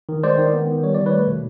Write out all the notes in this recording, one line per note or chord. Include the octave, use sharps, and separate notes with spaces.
D#3
G#3 C5 D5
D#3
B3
D#3
G3 C#5
D#3 D5
B4 C#5
A3
B2